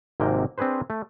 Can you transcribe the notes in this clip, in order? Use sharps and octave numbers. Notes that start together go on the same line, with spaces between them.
G#1 G#2 C3 A#3 G5
C4 D4 G#4 B4 C5
A3